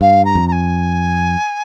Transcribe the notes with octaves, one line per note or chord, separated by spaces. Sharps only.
G2 F5
A#5
F2
A#5
G#5